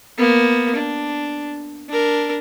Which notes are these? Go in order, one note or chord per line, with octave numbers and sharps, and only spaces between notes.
A#3 B3
D4
D4 A#4